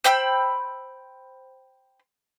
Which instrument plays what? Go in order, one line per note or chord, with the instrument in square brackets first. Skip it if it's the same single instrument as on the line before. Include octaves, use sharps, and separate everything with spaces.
[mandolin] C5 G5 B5 E6